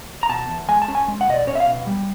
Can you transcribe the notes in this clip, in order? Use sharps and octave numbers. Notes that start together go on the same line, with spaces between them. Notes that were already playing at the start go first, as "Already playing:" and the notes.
A#5
B2 A5
E2
G#3 G#5
A5
C#4
G#5
G#3
F#5
B2 D#5
D5
C#4 C#5
E5
F5
B2
G3